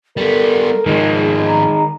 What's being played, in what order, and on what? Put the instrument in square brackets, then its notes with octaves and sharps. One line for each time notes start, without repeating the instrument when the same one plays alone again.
[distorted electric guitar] G3 B3 [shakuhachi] A4 [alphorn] A#4
[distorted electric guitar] G#2 F3 [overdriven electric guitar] D#3 G#3 [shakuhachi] G#4
[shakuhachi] A#5